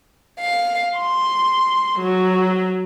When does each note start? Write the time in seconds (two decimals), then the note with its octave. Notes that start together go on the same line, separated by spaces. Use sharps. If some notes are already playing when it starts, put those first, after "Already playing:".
0.40 F5
0.97 C6
2.00 F#3